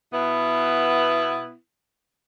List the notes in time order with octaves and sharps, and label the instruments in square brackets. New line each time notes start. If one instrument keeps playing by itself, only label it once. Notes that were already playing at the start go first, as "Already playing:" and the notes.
[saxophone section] B2 B3 E4